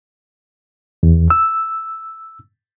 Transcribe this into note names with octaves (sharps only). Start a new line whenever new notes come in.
E2
E6